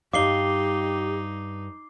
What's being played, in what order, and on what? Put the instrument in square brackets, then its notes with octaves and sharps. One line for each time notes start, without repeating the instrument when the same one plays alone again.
[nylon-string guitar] G2 D#5 F5 [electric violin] D#4 [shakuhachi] G4 [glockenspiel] D6 C7 G7